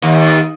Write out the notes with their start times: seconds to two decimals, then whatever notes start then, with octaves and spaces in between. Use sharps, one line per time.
0.02 D#2